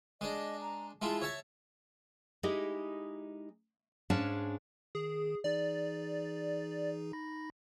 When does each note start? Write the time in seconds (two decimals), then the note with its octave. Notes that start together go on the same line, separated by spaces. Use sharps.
0.21 G#3 D4 D#5
0.61 A#5
1.02 G#3 E4 F4 A5
1.22 C#5 E5 A5 G#6
2.43 G#3 D#4 E4 G4 D#5
4.10 G#2 G#3 C#4 D4 F5 A5
4.95 D#3 G#4
5.44 E3 D#4 G#4 D5
7.13 D#4 B5 A#6